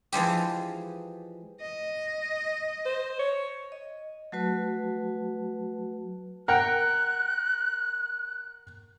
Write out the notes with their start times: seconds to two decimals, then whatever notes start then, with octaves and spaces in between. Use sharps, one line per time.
0.12 E3 F3 G#3 G4
1.61 D#5
2.85 C5
3.19 C#5
3.72 D#5
4.32 F#3 A3 F#4 B4 A5
6.48 A#4 F#5 G5 F#6